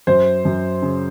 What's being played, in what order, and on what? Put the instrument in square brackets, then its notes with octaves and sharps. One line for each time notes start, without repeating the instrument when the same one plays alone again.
[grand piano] F#2 C5
F#2
C#3